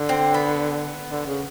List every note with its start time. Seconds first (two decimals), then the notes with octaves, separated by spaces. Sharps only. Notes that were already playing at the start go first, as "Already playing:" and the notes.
Already playing: D3
0.09 C4
0.34 B3
1.09 D3
1.26 C#3